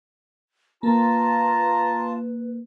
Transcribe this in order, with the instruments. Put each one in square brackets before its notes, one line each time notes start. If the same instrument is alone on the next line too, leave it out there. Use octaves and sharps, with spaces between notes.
[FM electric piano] A#3 [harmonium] F4 A5 [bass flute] B4 [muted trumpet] A#5